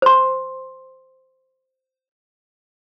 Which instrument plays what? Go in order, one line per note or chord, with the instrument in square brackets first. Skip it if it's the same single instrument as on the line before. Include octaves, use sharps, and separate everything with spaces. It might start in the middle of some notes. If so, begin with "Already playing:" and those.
[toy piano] C5 C6